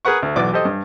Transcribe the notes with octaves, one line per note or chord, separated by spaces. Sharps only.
G#4 A#4 B4 F#5 C#6
D2
B1 E3 F#4 D5 D6
G4 A4 C5 D#5
G2